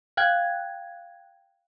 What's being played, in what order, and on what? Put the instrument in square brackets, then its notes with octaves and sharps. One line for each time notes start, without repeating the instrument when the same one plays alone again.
[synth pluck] F5 G5 F#6 G#6